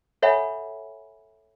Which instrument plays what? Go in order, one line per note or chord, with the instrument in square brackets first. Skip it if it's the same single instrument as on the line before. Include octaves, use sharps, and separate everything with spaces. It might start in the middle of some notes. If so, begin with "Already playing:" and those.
[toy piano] A4 C#5 E5 F#5 G#5 B5